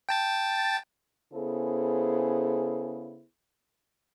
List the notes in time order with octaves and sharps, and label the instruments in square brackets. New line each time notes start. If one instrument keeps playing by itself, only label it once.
[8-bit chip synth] G5 A5 A6
[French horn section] C#3 B3 E4 G#4 A4 C5